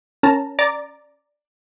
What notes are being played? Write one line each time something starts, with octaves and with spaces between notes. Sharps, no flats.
C#4 A#4 A5 A#5
D5 A#5 D6 A6